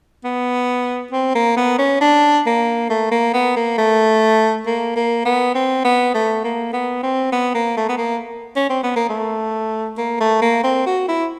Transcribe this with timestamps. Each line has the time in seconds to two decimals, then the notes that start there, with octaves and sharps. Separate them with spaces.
0.24 B3
1.12 C4
1.35 A#3
1.57 B3
1.79 C#4
2.01 D4
2.46 A#3
2.90 A3
3.11 A#3
3.34 B3
3.56 A#3
3.78 A3
4.67 A#3
4.96 A#3
5.25 B3
5.55 C4
5.85 B3
6.15 A3
6.44 A#3
6.73 B3
7.03 C4
7.32 B3
7.54 A#3
7.77 A3
7.89 B3
7.98 A#3
8.56 C#4
8.69 C4
8.83 B3
8.96 A#3
9.09 A3
9.98 A#3
10.20 A3
10.42 A#3
10.64 C4
10.87 F#4
11.09 E4